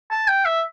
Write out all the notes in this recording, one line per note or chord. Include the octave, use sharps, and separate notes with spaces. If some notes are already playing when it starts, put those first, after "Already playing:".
A5
G5
E5